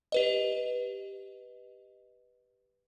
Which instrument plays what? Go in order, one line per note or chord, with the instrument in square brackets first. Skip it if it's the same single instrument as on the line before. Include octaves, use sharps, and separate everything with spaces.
[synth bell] G4 B4 D#5